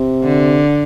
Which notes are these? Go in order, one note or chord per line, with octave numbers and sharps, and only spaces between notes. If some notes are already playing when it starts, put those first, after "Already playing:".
Already playing: C3
D3